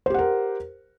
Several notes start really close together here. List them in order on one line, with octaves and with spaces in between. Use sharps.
C5 G4 F#5 A#4